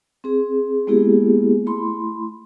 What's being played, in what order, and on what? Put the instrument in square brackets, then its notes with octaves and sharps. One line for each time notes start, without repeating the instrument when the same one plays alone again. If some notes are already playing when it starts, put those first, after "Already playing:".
[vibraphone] C4 G#4
G#3 A#3 B3 E4 G4 G#4
A3 E4 B5 C6